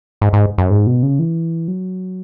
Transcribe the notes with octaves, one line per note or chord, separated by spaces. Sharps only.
G#2
G#2
F#2
G#2
B2
C#3
E3
F#3